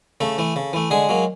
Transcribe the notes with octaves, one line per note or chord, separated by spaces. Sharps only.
C#3 A3 A4
E3 A3
C#3
E3 A3
D3 G#3 G#4
F#3 A#3